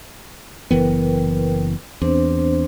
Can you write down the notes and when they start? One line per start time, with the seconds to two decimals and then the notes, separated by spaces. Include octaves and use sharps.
0.71 F#1 E3 B3 A#4 B4 G5
2.02 E2 C4 D4 C5